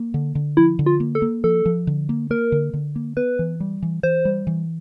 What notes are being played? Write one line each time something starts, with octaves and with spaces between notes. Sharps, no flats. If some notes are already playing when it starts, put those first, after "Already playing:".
Already playing: A#3
D3
D3
F3 E4
D3
F4
A#3
A4
A#3
F3 A4
F3
D3
A#3
A#3 A#4
D3
D3
A#3
B3 B4
E3
G3
E3
E3 C5
G3
E3